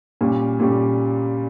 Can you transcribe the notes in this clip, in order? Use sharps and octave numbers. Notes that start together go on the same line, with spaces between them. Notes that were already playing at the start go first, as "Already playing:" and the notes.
A#2 G3 C#4
A#2 G3 C#4